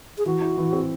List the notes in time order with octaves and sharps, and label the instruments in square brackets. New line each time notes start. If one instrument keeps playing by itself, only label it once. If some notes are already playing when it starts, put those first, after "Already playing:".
[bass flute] G#4
[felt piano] E3 [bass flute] F#4
[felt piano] E4
E3
C4